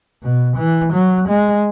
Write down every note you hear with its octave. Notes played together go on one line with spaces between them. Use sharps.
B2
E3
F#3
G#3